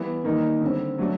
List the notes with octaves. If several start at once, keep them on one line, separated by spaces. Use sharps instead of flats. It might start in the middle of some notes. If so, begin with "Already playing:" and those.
Already playing: E3 G3 B3
D#3 G3 A#3 D#4
D3 G3 C4
F#3 A3 D4 F#4